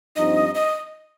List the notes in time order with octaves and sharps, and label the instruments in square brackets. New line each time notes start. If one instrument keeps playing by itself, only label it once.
[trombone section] G2 F3 C4 D#4 [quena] D#5
[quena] D#5